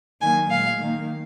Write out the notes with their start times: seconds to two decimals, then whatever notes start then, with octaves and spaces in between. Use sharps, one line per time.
0.21 D#3 F#3 A#3 G#5
0.51 A#2 G#3 F5
0.81 D#3 A#3